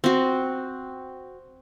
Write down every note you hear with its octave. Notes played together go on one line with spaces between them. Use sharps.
C4 F#4